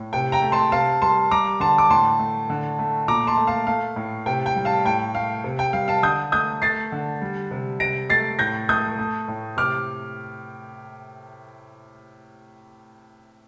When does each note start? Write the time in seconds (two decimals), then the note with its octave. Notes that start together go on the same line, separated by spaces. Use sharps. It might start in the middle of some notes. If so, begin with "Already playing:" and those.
Already playing: A2
0.13 C3 G5
0.32 G5 A#5
0.42 A3
0.52 A5 C6
0.72 C3 F5 A5
1.02 G3 A5 C6
1.31 G3 A#5 D6
1.60 D3 A5 C6
1.78 D6
1.89 A2 A5 C6
2.19 A3
2.50 D3
2.79 A3
3.08 A#2 A#5 D6
3.27 A5 C6
3.37 A3
3.47 F5 A5
3.67 A3 F5
3.96 A2
4.26 C3 G5
4.46 G5
4.56 G3
4.65 F5 A5
4.85 A2 G5
5.15 A3 F5
5.44 C3
5.59 G5
5.73 G3 F5
5.88 F5 A5
6.03 D3 D#6 G6
6.32 A3 D#6 G6
6.62 A3 A6 C7
6.92 D3
7.22 G3
7.51 C3
7.80 C3 A#6 D7
8.09 A3 A6 C7
8.39 A2 G6 A#6
8.69 A3 D#6 G6
8.99 A3
9.28 A2
9.57 C3 D6 F6